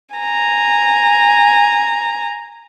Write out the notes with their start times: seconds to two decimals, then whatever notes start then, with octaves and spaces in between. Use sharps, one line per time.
0.16 G#5 A#5